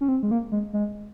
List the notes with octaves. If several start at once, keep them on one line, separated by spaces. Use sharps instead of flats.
C#4
C4
G#3
A#3
G#3
G#3